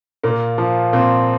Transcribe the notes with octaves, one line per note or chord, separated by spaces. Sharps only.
A#2 A#3
F3
A#2 C4